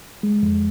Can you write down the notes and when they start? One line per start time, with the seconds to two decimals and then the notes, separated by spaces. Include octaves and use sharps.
0.23 G#3
0.43 F2